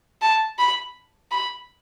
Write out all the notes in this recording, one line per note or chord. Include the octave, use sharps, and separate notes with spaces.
A5
B5
B5